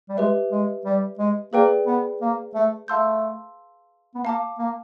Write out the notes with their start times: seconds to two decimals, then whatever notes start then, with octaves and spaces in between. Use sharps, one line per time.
0.09 G3
0.17 G#3 G4 B4 E5
0.52 G#3
0.85 G3
1.19 G#3
1.53 A#3 G#4 B4 D5 G5
1.87 B3
2.21 A#3
2.55 A3
2.88 A3 F5 A5 C6 E6 G6
4.15 B3
4.24 A#3 F5 A5 D6
4.59 A#3